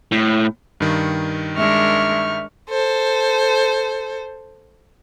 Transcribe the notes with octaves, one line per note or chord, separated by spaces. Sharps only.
A2
G2 D#3
G#3 D4 A#4 E5 C#6 F6
A4 C5